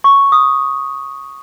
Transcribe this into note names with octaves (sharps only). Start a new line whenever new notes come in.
C#6
D#6